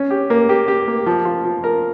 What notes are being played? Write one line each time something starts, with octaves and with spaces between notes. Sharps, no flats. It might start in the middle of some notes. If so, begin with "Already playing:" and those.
Already playing: C#4
G4
A#3
G4
G4
A#3
F3
F4
F3
A#4